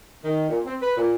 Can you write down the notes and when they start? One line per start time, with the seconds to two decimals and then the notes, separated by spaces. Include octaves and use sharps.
0.24 D#3
0.49 A#2
0.66 C4
0.82 B4
0.97 A#2